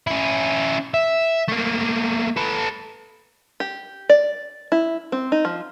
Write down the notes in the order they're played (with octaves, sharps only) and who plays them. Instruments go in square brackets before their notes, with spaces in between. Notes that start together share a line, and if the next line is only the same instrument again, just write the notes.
[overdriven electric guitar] C#4 E4
E5
A3 A#3
A4 B4
[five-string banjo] G4
D5
E4
C4
D#4
F3